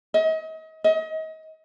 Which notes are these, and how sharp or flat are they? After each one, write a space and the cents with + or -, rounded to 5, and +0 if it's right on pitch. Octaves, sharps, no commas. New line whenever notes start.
D#5 +35
D#5 +35